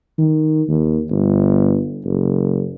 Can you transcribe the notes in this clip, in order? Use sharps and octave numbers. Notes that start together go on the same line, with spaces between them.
D#3
D#2
G1
F#1